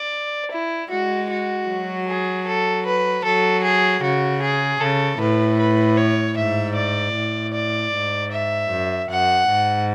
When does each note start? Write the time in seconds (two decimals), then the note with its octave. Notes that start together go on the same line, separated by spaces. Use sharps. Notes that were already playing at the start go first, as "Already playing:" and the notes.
Already playing: D5
0.52 E4
0.91 G#3 F#4
1.30 F#4
1.68 F#3
2.08 G#4
2.47 A4
2.86 B4
3.25 F#3 A4
3.64 G#4
4.03 C#3 F#4
4.42 G#4
4.81 C#3 A4
5.19 A2 B4
5.59 B4
5.97 C#5
6.37 G#2 E5
6.76 D5
7.16 A2
7.54 D5
7.94 G#2
8.32 E5
8.71 F#2
9.10 F#2 F#5
9.50 G#2